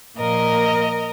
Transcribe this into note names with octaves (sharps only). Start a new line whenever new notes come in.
A#2 F3 A#3 A#4 D#5